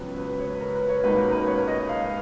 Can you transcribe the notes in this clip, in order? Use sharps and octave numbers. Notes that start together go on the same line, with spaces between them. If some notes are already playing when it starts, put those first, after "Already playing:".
Already playing: C#2 C#3 F#3 B3 B4
B4
C#5
B4
A#4
B4
C#5
C#2 B2 A#3 D#4 B4
A#4
B4
C#5
D#5
F5